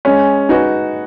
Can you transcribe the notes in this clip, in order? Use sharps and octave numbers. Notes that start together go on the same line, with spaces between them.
G#3 C#4
D#4 F#4 B4